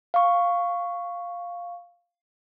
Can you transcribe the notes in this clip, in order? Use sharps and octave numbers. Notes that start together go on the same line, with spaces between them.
F5 C#6